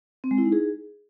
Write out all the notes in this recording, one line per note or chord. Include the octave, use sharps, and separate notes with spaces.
C4
G#3
E4
D#4
G#4